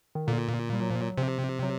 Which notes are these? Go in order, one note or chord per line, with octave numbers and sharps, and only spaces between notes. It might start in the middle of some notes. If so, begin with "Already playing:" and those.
D#3
A#2 D3
G3
F#3
F3
F#3
C3 F3
F#3